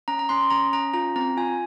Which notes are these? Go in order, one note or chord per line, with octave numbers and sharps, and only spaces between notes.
C#4 A#5
A#5
C#4 C6
C#4 A#5
C#4 A#5
F4 A#5
C4 A#5
F4 G#5